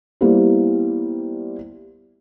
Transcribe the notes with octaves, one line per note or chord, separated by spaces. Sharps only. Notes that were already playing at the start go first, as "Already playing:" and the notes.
G3 A#3 B3 E4 G4 C5